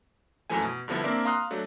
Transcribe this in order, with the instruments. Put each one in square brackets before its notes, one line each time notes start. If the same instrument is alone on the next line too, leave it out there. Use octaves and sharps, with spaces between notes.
[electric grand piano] F#2 E3 F3 A3 G#5
B2
G2 D3 F3 B3 E4
A#3 C4 D4 A#4 D5 E5
F5 A#5 C6 D#6 F#6
F#3 A3 D4